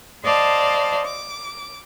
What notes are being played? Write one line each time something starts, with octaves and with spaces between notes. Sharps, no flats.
C5 D5 D#5 F5 A5
D6